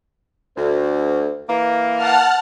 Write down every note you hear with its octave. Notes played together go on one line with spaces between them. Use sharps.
D2
E3 A#3
F#5 A5 F6